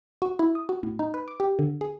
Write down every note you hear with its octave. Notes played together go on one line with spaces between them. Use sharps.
F#4
E4
D#6
F#4
A2
D#4
B4
D6
G4
D3
G#4